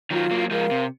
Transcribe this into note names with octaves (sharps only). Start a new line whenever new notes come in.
D#3 F#3 F4
F#3 A#3
F3 G#3 A#4 F5
C3